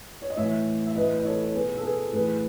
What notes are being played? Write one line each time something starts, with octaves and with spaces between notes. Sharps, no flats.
C#5
D#5
A2 E3 C#5 E5
E5
A2 E3 B4 D#5
D#5
A4 C#5
C#5
B2 G#4 B4
A4
G#4 B4
A2 E3 G#4 B4